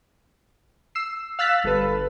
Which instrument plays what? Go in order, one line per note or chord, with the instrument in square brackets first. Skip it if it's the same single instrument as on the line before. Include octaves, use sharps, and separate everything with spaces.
[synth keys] E6 C7
F5 E6 F#6 A6 B6
G1 A4 B4